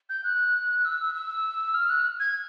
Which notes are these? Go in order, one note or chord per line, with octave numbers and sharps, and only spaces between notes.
G6
F#6
E6
E6
F6
F#6
G#6